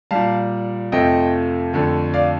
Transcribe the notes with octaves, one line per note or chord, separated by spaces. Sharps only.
A#2 G3 F5 A5
F2 C3 F3 A3 D#5 G5
F2 D3 A3
D5 F5